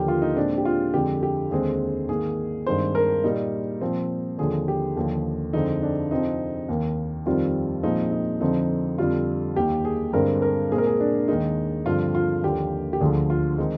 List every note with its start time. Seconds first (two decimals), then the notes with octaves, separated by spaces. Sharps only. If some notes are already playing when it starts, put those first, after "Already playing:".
Already playing: D#2 D3 F3 A#3 G4
0.08 F4
0.22 D#4
0.36 A#2 G#3 C4 D4
0.58 G4
0.65 F4
0.94 F2 D3 G#3 G4
1.23 G4
1.51 D#2 D3 G#3 C4 G#4
2.09 G#2 D#3 A#3 G#4
2.66 G2 D#3 G#3 C4 C5
2.95 A#4
3.24 A#2 G3 A#3 D#4
3.81 A#2 F3 C4
4.38 D#2 D3 F3 G#4
4.68 G4
4.97 D#2 D3 F3
5.53 F2 D3 G#3 C4 D#4
5.82 D4
6.11 F2 C3 F3 C4 D#4
6.69 D#2 D#3 A#3
7.26 F2 D#3 G3 C4 F4
7.83 A#2 F3 G#3 C4 D#4
8.12 D#4
8.41 F2 D3 F3 C4 D#4
8.98 F2 D3 G3 F4
9.56 D#2 D#3 A#3 G4
9.85 G#4
10.13 G2 D3 G#3 C4 A#4
10.42 A#4
10.71 A#2 G#3 C4 G#4
10.78 A#4
10.86 G#4
11.00 D4
11.28 D#2 D#3 G#3 D#4
11.86 G2 D3 F3 C4 F4
12.15 F4
12.43 D#2 D3 F3 A#3 G4
12.93 G4
13.00 D2 D3 F3 G#4
13.30 F4
13.58 D#3 G#3 C4 D#4